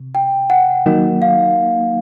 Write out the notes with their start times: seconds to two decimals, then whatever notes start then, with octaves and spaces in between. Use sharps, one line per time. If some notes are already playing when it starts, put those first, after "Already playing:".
Already playing: C3
0.15 G5
0.50 F#5
0.86 D#3 F#3 A#3 D#4
1.22 F5